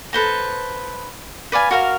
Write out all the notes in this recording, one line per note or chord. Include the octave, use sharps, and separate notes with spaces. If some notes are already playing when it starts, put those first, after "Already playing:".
A4 B4 C5 A#5
B4 D5 F5 G#5
F#4 A#4 F5